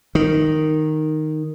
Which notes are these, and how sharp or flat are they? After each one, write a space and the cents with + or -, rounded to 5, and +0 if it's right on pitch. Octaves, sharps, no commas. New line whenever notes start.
D#3 -5